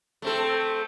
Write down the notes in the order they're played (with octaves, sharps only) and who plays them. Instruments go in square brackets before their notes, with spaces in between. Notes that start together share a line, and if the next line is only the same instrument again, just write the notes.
[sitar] A3 C4 A4